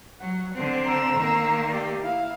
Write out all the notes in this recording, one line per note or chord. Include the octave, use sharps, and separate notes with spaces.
F#3 F#5
D3 C4
A#5 E6
D#3 A#3
G4 D5
E4 F5